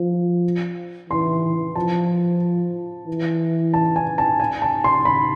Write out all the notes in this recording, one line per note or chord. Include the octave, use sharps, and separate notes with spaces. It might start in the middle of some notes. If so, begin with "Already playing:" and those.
Already playing: F3
E3 C6
F3 A5
E3
A5
G#5
A5
G#5
A5
C6
B5